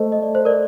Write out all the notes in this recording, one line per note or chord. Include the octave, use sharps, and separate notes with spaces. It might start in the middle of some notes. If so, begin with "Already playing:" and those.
Already playing: A3 C5 D#5
D#5
D5
C5
A#4 D5